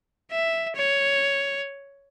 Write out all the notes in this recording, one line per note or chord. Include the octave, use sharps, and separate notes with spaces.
E5
C#5